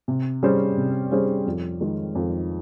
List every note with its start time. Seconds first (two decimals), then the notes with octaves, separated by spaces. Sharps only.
0.08 C3
0.43 G3 C#4 G#4 C5
0.77 C3
1.12 G3 C#4 G#4 C5
1.46 F2
1.81 D#3 G#3 D#4
2.15 F2